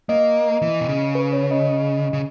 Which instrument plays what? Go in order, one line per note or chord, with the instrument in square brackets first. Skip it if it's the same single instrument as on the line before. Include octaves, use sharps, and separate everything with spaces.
[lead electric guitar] A#3 [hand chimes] D#5
[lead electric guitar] E3
B2
C#3
[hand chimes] B4
C#5
D#5
[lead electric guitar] C#3